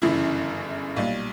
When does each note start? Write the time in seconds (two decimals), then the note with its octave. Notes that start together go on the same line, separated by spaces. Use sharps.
0.02 G1 F#2 C#3 E3 E4
0.96 B1 A#2 G3 F4